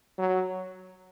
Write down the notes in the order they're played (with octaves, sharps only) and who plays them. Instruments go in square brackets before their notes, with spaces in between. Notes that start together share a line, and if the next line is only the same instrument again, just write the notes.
[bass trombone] F#3